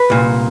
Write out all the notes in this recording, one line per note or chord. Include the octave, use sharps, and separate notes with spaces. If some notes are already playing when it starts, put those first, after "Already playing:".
Already playing: B4
C2 A#2